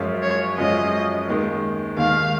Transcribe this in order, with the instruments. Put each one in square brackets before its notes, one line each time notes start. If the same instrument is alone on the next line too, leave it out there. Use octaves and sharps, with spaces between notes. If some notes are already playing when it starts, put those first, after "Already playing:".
Already playing: [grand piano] F#2 F3 G#3 C#4 F4
[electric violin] C#5
[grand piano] F#2 F3 G#3 C#4 F4 [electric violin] D#5
[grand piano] D#2 D#3 G#3
[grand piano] D#2 D#3 G#3 [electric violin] F5